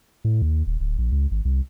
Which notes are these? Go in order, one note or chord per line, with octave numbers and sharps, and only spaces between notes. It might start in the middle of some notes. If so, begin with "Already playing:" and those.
A2
D#2
D#1
D1
A#1
C#2
G#1
C2